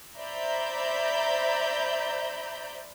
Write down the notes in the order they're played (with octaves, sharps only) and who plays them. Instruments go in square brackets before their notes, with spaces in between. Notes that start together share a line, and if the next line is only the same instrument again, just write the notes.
[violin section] C5 D5 E5 A#5 B5 G6